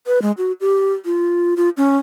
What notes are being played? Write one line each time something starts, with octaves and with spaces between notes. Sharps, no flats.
B4
G#3
F#4
G4
F4
F4
C#4